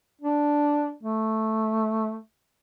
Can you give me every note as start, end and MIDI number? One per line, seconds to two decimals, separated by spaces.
0.22 0.92 62
1.03 2.18 57